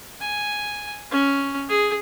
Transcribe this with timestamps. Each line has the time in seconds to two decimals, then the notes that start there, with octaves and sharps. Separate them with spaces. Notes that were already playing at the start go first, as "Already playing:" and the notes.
0.21 G#5
1.12 C#4
1.69 G#4